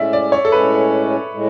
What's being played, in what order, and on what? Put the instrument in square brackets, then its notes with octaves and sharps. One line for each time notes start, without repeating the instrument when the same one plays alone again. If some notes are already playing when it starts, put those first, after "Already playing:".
Already playing: [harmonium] A2 G#3 C#4 [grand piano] D5 E5
[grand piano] D5
C#5
A4
[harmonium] A2 G#3 C#4 [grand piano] B4
[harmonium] A2 G#3